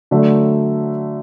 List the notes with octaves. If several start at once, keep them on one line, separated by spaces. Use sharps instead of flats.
D3 F#3 A3